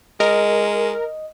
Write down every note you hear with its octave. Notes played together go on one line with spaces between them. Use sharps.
G#3 A#4 D#5